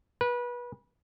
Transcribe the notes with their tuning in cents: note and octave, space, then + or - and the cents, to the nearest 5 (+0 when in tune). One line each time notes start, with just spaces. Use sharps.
B4 -25